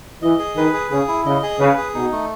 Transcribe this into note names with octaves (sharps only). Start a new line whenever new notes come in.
E3 D#5
G#4
D#3 B4
G#4
C#3 G#4
E4
C#3 D#5
G#4
C#3 B4
G#4
B2 D#4
A3